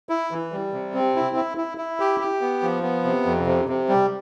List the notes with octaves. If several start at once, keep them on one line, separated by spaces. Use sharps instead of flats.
E4
E3
G3
C3
C4
E4
E4
E4
E4
G4
G4
B3
F3
B3
C3
F2
C3
C3
G3